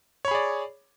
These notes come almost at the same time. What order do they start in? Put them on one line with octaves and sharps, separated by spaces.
C#5 B5 G#4 D5